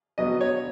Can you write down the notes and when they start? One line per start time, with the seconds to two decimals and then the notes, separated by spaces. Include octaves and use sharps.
0.18 B2 F#3 B3 D#5
0.41 C#5